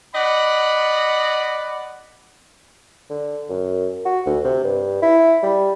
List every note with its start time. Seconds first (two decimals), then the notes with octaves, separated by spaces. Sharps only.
0.15 D5 D#5 F#5 B5
3.10 D3
3.49 F#2
4.05 F#4
4.26 D2
4.45 C3
4.64 G2
5.02 E4
5.43 G3